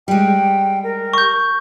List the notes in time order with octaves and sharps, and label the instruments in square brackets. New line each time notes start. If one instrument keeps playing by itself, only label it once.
[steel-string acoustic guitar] G3 G#3 [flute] G5
[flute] A#4
[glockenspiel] C#6 G6